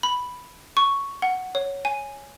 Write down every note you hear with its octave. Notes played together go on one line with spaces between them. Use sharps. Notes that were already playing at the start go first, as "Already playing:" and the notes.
B5
C#6
F#5
C#5
G#5